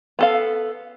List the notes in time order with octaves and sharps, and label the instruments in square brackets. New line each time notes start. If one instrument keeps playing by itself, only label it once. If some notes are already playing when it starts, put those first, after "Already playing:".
[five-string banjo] B3 A4 F5